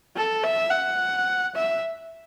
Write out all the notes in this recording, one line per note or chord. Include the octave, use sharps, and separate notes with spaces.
A4
E5
F#5
E5